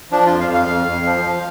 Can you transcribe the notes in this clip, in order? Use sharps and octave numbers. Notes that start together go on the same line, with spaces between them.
F3 D4
F2 F4
F5
F2
F5
F2
F2
F3
F3